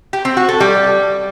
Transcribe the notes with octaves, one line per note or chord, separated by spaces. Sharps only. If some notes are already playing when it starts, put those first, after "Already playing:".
G4
C4
F#4
A4
G3